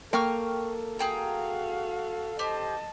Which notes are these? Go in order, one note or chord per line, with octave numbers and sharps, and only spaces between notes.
A#3 A4 G5 C#6 F6
F#4 G#4 F5 G5 A#5
G4 C5 D#5 A5